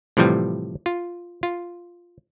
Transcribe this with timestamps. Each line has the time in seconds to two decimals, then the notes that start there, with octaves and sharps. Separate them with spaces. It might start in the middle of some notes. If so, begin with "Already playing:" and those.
0.17 A2 C3 E3 F3 G3
0.86 F4
1.43 F4